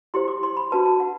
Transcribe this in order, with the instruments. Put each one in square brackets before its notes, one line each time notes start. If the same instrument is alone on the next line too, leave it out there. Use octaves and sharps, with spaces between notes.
[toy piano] E4 G4 C5 C6
D6
C6
B5
D4 F#4 B4 A5
A5
F#5